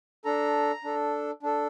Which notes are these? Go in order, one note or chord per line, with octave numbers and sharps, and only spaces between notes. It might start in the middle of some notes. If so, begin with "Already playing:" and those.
D4 A4 A#5
D4 A4
D4 A4